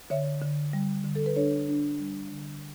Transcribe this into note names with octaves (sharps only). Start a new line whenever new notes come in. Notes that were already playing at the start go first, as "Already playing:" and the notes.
D3 C#5 E5
D3
G3
D3
A4
B4
D4 A4 C#5
D4
G3
D3